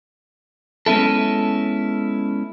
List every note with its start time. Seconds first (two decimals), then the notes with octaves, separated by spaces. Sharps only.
0.86 G#3 B3 C#4 E4 A4